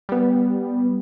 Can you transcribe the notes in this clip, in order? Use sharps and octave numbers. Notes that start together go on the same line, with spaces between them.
G3 B3